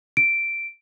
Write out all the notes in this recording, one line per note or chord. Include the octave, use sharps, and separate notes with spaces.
D7